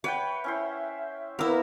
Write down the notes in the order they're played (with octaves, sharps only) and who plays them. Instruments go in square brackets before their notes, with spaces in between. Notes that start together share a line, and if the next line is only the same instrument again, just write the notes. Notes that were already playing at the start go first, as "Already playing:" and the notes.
[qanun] B4 [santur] C#5 F#5 G5 [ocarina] E5
[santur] C#4 E4 C5
[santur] A#3 E6 [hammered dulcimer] B3 [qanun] E4 A#4 [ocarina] B4